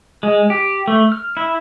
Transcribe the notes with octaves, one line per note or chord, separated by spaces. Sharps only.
G#3
G4
A3
F6
E4